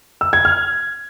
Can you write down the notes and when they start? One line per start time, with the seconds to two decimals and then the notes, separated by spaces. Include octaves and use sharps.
0.21 E6
0.33 G#6
0.45 F6